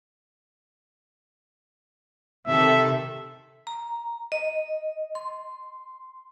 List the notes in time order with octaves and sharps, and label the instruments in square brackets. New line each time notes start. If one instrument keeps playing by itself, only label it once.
[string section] C3 D#3 A4 [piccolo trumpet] E5
[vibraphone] A#5
D#5
C6